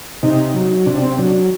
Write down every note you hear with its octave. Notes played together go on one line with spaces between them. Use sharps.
C3 D#4
F#3
C3 D4
C4
F#3 D4